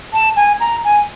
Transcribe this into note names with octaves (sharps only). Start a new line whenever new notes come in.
A5
G#5
A#5
G#5